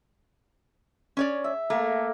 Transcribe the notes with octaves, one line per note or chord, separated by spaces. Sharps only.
C#4 C#5 D5
E5
A3 A#3